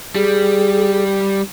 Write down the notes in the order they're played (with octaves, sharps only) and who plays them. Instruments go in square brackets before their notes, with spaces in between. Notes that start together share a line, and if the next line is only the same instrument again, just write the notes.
[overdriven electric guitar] G3 [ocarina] G#4